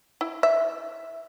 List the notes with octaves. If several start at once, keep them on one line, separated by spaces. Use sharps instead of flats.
E4
E5